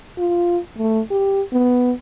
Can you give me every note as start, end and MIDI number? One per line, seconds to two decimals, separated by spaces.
0.18 0.58 65
0.78 1.01 57
1.11 1.42 67
1.53 1.92 59